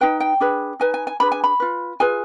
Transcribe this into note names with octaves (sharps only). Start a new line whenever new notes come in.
D#4 B4 G5
G5
D4 G#4 B4
D#4 B4 G#5
G#5
G#5
D4 G#4 B4 B5
G#5
B5
F4 B4
F4 G#4 B4 G#5